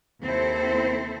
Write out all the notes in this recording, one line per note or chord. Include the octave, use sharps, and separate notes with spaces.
D#2 C3 C4 E4 A4 C5